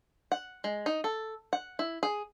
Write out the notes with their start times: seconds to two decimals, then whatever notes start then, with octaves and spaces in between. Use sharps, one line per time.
0.32 F#5
0.64 G#3
0.86 D#4
1.04 A4
1.53 F#5
1.79 E4
2.03 G#4